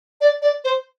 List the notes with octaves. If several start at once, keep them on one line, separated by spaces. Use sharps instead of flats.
D5
D5
C5